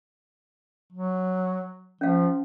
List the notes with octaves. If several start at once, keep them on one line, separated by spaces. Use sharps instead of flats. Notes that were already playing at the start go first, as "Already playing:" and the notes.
F#3
F3 C#4 F5